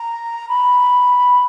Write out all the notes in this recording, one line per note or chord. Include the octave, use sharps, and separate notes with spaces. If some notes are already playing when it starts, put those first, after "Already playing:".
Already playing: A#5
B5